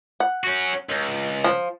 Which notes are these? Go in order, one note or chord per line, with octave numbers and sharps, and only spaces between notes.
F#5
C#4 F#4
C#2
F3